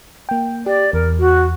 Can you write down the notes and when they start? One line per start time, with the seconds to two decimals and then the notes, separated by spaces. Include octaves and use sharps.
0.29 A#3 G5
0.66 G4 D5
0.93 E2 A#4
1.19 F#4